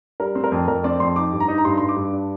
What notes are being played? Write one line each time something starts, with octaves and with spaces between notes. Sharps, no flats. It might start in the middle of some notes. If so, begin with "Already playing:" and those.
G3 A#4
C4
A#4
F2
F2 A#4
C4 D5
F2 C6
D#4 D6
G2
A#5
D#4
A#5
G2 C6
G2 C6
D6
G2
D4